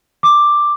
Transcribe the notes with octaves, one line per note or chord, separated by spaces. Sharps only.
D6